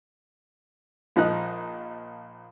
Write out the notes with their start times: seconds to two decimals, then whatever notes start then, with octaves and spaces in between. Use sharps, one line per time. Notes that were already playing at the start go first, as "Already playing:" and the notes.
1.16 A#1 F3 D#4 F#6